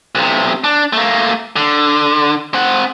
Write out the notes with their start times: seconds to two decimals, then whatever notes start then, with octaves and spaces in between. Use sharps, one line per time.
0.15 B1 C3
0.64 D4
0.93 A3 A#3
1.56 D3
2.54 C4 F#5